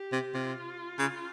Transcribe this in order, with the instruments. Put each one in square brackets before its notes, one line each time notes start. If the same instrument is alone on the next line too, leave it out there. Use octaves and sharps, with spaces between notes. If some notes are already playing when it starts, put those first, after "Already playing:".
Already playing: [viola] G4
[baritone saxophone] C3
[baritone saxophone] C3 [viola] F4
[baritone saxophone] C#3